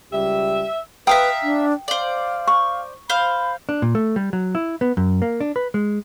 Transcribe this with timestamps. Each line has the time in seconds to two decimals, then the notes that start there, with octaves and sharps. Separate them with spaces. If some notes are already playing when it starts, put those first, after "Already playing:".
0.13 C#2 G3 G4 E5
1.07 B4 E5 F5 G5 A#5 D#6
1.43 D4
1.88 C5 D5 F5
2.47 C#6
3.10 C5 F5 B5
3.69 D4
3.82 A#2
3.95 A3
4.16 G3
4.33 F#3
4.55 E4
4.81 B3
4.97 F#2
5.22 A#3
5.41 D4
5.56 B4
5.74 G#3